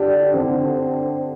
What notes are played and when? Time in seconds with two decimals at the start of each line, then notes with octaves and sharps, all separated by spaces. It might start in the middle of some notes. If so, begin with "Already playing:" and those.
Already playing: D3 D4 G4
0.34 D3 C4